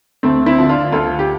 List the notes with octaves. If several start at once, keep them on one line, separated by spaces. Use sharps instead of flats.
D2 A3 C4
C4 E4
D3 F3
D4 F4
D2 F4 A4
G4